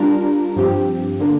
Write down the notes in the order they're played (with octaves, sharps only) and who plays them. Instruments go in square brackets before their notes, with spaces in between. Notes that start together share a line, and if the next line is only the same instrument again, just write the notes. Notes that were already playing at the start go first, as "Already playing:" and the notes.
Already playing: [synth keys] G3 D4 F4 A#4
G2 F3 C4 G4
D3 A#3